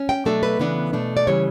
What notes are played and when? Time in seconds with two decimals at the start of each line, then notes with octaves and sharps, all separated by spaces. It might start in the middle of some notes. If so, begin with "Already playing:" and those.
Already playing: C#4
0.09 G5
0.25 B2 F#3 A3 D4 A4
0.43 B4
0.59 C#3 E3 B3 D4
0.93 B2 A3 D4
1.17 D5
1.27 C#3 E3 G3 C#5